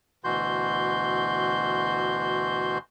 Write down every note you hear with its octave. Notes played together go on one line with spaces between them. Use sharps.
D2 B2 E3 F#4 C6 G6